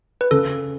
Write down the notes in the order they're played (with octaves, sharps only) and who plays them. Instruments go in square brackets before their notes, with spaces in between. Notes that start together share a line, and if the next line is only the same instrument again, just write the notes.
[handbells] B4
[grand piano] C#3 [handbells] A4